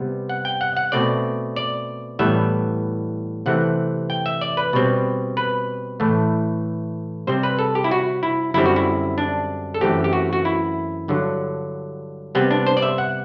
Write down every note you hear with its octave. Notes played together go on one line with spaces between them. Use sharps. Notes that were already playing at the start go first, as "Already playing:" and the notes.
Already playing: C3 G3 B3
F#5
G5
F#5
F#5
B2 A3 C4 D5
D5
A2 E3 G3 B3 E5
C3 E3 A3 C4 F#5
G5
E5
D5
B4
B2 G3 C4
B4
A2 E3 A3
C3 G3 C4 C5
B4
A4
G4
E4
F#4
E4
F#2 D3 G3 C4 E4
F#4
E4
D4
A4
F#2 E3 A3 C4 G4
G4
F#4
F#4
E4
G2 D3 F#3
C3 G3 B3 C4
D4
C5
D5
E5
F#5